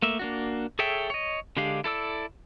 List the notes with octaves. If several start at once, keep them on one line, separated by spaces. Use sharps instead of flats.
A3 A#3 E5
A#3 D4 F#4
G#4 A4 C#5 E5 G5
C#5 D#5
D3 G#3 D4 G4 F5
E4 A4 D5 E6